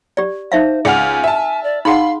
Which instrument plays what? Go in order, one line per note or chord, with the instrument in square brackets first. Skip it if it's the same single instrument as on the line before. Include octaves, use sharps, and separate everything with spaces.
[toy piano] G4 D5
[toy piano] D#4 E5 F5 [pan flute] C5
[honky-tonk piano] C#2 F6 [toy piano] G#4 F#5 [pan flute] G#5
[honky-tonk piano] E5 A5
[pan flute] D5
[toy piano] D#4 G#4 F#5 [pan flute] F5 [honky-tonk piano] B5 C6